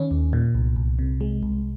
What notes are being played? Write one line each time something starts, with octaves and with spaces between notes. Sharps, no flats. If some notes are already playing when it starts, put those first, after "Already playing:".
Already playing: D#3 C#4
D#2
A#2
C2
C2
C3
G#3
C2